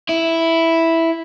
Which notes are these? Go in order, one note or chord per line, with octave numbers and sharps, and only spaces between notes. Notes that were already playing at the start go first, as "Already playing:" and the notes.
E4